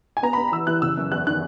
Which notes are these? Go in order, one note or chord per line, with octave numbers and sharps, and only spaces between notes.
G#5
B3 A#5
B3 B5
E3 E6
E3 F#6
C#3 E6
F#2
E2 F#6
D#3 F#6